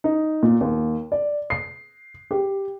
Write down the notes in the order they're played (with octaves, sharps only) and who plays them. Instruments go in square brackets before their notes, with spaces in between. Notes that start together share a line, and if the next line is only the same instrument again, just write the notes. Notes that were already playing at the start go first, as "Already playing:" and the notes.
[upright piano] D#4
A#2
D#2
D5
C7
G4